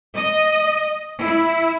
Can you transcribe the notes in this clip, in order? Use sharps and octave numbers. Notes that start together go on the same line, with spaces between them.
D#5
E4